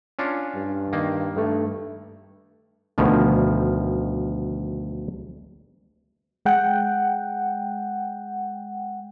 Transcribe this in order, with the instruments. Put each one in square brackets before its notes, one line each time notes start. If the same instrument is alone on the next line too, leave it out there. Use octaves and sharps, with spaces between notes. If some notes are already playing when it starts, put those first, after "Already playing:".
[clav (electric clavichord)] C#4 D4 F4
[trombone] G2
[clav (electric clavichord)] D#3 A#3
[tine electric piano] G2 A3 [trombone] A4
[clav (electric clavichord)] D2 B2 D#3 F3
[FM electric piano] G#3 F#5 G5